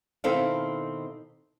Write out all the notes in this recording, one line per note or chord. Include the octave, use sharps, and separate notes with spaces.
B2 D#3 C4 E4 A4 F5